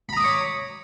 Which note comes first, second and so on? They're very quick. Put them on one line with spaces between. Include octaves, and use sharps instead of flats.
B5 A#5 D#6 D6 C#5